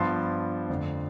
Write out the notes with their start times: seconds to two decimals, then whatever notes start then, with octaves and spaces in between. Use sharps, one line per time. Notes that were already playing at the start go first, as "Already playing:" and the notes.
Already playing: G2 F3 B3 A5 C6
0.69 F2 D3 A3